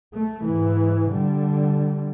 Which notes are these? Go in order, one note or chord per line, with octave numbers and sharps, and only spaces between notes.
A3
G#2 E3
D3 G3